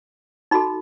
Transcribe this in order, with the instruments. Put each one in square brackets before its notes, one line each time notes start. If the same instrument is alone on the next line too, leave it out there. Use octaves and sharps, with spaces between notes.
[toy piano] D#4 F#4 A4 B5